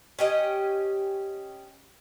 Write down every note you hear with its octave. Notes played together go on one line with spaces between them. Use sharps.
C#4 G4 D#5